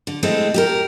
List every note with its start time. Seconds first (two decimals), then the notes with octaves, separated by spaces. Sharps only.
0.07 D3
0.23 G#3 A3 C4 E4 A4
0.54 G4 G#4 A#4